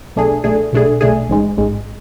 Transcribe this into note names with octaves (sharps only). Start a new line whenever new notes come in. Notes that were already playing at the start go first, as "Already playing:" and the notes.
B1 B2 A3 D4 G#4
B1 B2 A3 D4 G#4
B1 B2 A3 D4 G#4
B1 B2 A3 D4 G#4
A1 G#2 G#3
A1 G#2 G#3